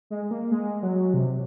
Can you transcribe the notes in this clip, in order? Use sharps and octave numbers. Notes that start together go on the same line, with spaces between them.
G#3
A#3
G#3
F#3
C3